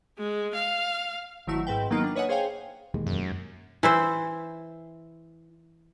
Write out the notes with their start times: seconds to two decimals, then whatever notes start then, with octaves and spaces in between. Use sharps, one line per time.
0.18 G#3
0.55 F5
1.47 G#1 D#3 F#3 A3 E4 E6
1.67 G#2 C4 B4 G5
1.90 D#3 F#3 A#3 B3 D#4 F4
2.04 D4 F6
2.16 B4 C#5 D#5 E5 F#5 G#5
2.29 G#4 C5 C#5 F5 G5 G#5
2.94 E1 D#2 G#3
3.07 F#2
3.83 E3 E4 C5